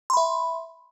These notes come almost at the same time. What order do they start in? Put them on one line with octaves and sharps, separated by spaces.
C6 B5 E5